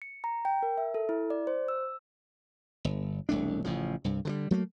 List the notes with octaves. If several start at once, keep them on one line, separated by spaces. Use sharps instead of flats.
C#7
A#5
G5
A#4
E5
A4
E4
D5
C5
E6
G1
E1 C2 A3 D4
A1 C#3 F3
C2 G2
D3 E3 G3
F#3 A3 A#3